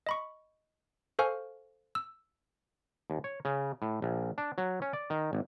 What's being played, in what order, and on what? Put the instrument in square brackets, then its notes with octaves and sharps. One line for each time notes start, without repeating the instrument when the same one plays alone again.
[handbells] D#5 B5 C#6
A4 C5 F5 G#5 C#6 F6
E6
[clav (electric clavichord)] D#2
C#5
C#3
A2
A#1
D4
F#3
C#4
D5
D#3
G#1